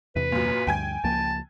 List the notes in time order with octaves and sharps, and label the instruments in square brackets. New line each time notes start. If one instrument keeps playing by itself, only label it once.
[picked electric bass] E2 C3 [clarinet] B4
[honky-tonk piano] F#2 A#2
[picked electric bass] D2 G2 [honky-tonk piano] G5 G#5 G#6
[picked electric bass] C#2 F3 A#3 [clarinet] A5